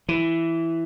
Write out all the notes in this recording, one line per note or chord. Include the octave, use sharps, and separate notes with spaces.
E3